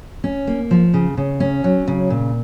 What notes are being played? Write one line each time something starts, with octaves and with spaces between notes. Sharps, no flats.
C#4
A#3
F3
C#3
C#3
C#4
F#3
C#3
A#2